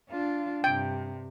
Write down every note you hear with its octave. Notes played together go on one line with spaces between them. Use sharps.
D4 F4
G2 C3 G5